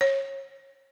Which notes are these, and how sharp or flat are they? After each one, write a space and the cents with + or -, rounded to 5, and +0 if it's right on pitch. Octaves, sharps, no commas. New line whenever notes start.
C#5 -25